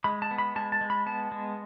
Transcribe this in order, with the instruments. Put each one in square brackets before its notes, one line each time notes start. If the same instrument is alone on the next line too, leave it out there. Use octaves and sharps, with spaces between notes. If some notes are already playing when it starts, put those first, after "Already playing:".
[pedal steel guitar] G#3 B5
A5
B3
B5
G#3 A5
A5
G#3
B5
B3 A5
G#3